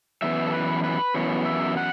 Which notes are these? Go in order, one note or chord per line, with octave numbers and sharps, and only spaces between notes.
F#2 E3 B3 E5
A4
B4
B4
F#2 E3 B3 C#5
E5
F#5